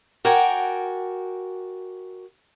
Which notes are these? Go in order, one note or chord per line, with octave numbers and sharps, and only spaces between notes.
F#4 A#4 D5 G5 G#5